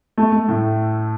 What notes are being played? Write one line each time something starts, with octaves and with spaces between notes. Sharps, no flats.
A3
A3
A2